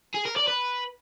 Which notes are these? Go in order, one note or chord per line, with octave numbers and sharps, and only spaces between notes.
G#4
A#4
D5
B4